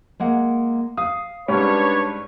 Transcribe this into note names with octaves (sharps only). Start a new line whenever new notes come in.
G#3 A#3 F#5
F5 D#6
G#2 G3 C#4 D4 B4 C#5